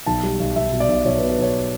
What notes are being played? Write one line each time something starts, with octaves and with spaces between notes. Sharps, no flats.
B1 A5
G3
B1
B1 E5
B2
D5
B1
B1 C#5
B4
B2
B4
B1 C#5